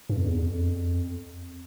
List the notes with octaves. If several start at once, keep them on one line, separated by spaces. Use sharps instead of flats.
G2
F2
E2
F2